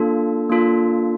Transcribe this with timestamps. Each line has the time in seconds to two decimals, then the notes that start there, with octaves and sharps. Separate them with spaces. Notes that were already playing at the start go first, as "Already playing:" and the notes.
Already playing: A#3 D4 F4 A4
0.50 A#3 D4 F4 A4